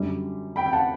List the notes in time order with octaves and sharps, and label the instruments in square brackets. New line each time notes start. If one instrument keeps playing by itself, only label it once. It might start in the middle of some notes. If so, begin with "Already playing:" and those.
Already playing: [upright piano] F#2 D3 G3
G5 B5
G5
F#5 A5